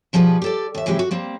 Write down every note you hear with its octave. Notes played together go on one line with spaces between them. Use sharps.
B2 F3 G3 G#4 A4 B4
G4 A4 D5
D#2 E5
C3 E3 F#3 G#3 E4 G4
F#4
G3 A#3 C4